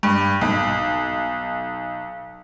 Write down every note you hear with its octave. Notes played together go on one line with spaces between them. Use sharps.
G2
B1